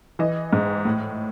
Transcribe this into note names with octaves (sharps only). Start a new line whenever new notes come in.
E3 D#5
G#2
A2